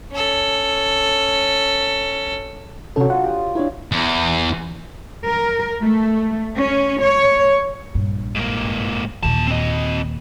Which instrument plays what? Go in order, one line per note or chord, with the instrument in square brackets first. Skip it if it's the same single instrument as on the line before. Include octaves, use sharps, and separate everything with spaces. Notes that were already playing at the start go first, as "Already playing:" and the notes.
[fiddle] C#4 A4
[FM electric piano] C3 C#4 A4 [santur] F#3 D4
[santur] F4 [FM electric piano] F#5
[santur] G4 D#6
[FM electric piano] D4 E4 [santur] B4 C#5 F5
[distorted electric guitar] E2
[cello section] A#4
A3
C#4
C#5
[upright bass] A#1 G2
[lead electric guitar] G#2 A#3
[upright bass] D#2 A#2 [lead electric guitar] E3 A5
[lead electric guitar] C4 D#5